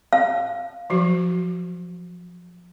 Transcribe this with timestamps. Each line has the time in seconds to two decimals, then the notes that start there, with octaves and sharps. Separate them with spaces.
0.13 F5
0.90 F3 F#3 F#4